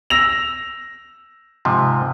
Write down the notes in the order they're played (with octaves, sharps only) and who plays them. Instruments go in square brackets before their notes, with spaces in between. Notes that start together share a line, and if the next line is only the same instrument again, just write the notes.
[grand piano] E6 A#6 F7
[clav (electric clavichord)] G#2 C3 F3